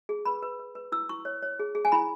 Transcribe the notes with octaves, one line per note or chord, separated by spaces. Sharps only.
G#4
B4 B5
B4
B4
B4
E4 E6
E4 C#6
C#5
C#5
G#4
G#4
G#5
E4 B5